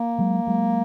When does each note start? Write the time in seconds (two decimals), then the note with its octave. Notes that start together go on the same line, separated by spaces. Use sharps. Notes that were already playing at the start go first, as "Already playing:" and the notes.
Already playing: A#3
0.18 F#3 G#3
0.47 F#3 G#3